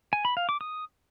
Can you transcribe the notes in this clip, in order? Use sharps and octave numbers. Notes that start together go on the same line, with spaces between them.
G#5
B5
F5
D6
D#6